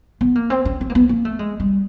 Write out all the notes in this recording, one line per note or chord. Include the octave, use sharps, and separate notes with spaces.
B3
A#3
C4
C#4
C4
A#3
B3
A#3
A3
G#3
G3